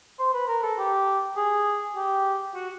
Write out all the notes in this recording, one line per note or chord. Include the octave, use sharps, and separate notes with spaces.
C5
B4
A#4
A4
G4
G#4
G4
F#4